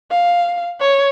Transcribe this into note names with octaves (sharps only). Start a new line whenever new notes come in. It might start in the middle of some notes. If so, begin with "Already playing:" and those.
F5
C#5